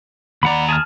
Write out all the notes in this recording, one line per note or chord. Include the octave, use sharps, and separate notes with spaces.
D#2 D5 F#5 A#5 B5
G#4 A5 F6